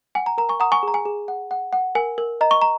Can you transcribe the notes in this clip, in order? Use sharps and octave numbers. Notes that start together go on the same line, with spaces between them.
F#5 G#5
A#5
A#4 A#5
G#5 C#6
F#5 A#5 D#6
G#5 C#6
G#4 A#5
G#5
G#4
F#5
F#5
F#5
A#4 G#5
A#4
D#5 A#5
C#6
A#5